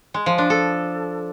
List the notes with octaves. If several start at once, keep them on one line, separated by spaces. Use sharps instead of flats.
G#3
F3
D4
A4